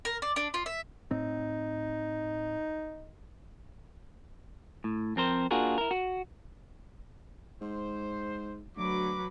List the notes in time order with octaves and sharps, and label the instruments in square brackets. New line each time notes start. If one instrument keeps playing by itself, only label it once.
[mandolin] A#4
D5
D4
F4
E5
[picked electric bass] A2 C4 [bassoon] D#4
[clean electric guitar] A2
F2 C4 A#4 C5
A#3 D4 F4 F#4 G#4 A#4
E4 A#4
F#4
[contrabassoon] G#2 [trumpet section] C5
[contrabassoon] D2 [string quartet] F#3 B4 [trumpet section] D6